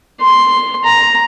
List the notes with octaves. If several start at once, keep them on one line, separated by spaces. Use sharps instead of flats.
C6
A#5